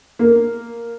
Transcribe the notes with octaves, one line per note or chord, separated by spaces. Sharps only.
A#3